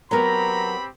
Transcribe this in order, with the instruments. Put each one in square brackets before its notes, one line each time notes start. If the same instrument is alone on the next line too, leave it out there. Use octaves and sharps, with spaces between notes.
[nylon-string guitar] F#3 B3 A#4 [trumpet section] C4 G4 B5 [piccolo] A#5